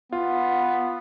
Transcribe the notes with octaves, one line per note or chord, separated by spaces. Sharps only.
B3 F4